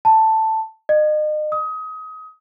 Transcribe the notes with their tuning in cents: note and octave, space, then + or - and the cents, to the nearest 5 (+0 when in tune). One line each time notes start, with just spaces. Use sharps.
A5 +5
D#5 -35
D#6 +25